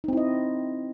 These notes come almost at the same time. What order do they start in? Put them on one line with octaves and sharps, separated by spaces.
D#4 C4 E4 D#5